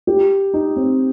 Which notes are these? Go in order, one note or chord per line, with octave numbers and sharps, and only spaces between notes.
G4
D#4
C4